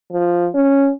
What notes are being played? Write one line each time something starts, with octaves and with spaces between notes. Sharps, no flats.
F3
C#4